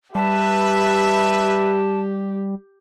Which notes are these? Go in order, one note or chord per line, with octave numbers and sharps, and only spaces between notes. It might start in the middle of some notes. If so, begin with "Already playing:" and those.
G3 G4 B4 E5 A5